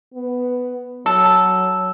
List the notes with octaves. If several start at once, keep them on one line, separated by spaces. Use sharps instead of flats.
B3
F#3 A4 E6